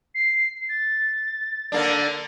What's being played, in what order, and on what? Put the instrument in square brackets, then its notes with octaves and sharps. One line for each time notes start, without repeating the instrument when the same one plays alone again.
[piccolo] C7
A6
[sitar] D3 A#3 D4